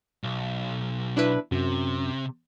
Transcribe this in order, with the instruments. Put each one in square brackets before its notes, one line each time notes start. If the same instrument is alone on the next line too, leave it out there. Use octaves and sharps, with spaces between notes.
[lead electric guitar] B1
[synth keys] D4 E4 B4
[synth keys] F#2 [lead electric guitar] C3